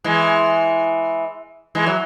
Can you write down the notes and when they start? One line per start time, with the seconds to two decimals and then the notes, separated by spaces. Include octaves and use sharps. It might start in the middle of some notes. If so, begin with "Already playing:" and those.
0.04 E3 G#3
1.75 E3 G#3
1.86 F#3